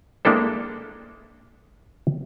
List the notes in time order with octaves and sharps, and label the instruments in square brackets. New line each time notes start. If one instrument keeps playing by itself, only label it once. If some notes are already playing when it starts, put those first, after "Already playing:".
[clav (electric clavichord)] G#3 A#3 D4 E4 A4 C5